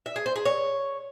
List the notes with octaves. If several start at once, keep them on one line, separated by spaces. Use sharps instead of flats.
E5
G#4
C5
G#4
C#5